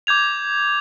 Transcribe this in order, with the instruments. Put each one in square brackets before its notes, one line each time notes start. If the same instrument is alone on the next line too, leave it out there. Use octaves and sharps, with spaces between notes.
[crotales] D6 G6 G#6 F7